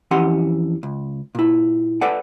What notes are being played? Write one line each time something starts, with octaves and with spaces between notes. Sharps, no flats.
F2 E3 C#4 G4 F#5 C6
C#2
A#2 E4
A4 B4 D5 F#5